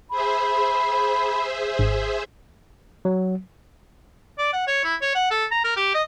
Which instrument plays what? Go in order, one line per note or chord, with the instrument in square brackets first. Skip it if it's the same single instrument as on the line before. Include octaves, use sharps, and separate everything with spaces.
[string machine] G#4 C5 E5 [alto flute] B5
[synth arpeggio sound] G#1
[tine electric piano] F#3
[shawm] D5
F#5
C#5
E4
C#5
F#5
A4
A#5
A#4
G4
D#5